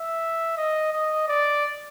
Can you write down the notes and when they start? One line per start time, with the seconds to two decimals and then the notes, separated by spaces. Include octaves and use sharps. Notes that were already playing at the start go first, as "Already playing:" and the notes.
Already playing: E5
0.58 D#5
0.93 D#5
1.28 D5